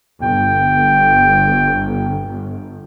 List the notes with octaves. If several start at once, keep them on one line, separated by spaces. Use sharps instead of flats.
G1 G5